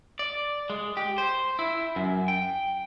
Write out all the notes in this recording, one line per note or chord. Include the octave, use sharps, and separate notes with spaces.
D5
G#3
G4
C5
E4
F#2
G5